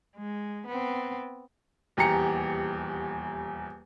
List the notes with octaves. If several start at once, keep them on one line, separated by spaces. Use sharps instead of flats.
G#3
B3 C4
D#1 E2 G4 A#5 C#7